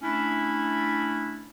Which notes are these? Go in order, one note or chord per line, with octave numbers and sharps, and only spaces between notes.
A3 C#4 D4 E4